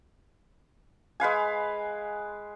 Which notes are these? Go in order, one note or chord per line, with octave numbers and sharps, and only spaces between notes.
G#3 B4 F5 G#5